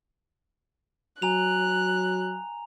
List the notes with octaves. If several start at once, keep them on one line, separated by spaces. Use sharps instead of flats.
F#3 G#5 A#5 F#6 F7